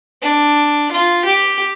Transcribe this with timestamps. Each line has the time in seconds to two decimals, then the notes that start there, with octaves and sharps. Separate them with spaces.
0.23 D4
0.92 F4
1.25 G4